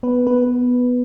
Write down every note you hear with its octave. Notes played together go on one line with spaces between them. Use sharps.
B3 B4
B3 B4